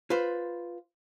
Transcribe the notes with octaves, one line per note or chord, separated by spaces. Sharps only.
F4 B4 C5